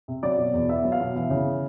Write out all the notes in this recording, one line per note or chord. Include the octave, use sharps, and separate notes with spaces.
C3
F#3 D5
B2
E2
B3 E5
F#3
F5
B2
E3
C#3